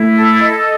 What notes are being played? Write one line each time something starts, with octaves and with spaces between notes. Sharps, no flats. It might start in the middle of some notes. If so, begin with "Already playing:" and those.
Already playing: A3 E4
A4
D#5